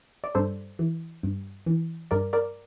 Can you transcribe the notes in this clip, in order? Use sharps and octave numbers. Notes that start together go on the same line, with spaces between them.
D5
G2 A4 C5
E3
G2
E3
G2 A#4 D5
A#4 D5